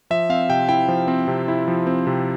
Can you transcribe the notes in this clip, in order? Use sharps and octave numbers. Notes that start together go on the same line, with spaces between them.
F3 E5
C4 F5
C3 G5
E4 G5
F3
C4
C3
E4
F3
C4
C3